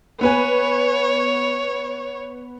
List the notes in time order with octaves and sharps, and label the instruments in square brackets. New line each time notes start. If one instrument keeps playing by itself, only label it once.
[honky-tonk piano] B3 B4 G#5 [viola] C#5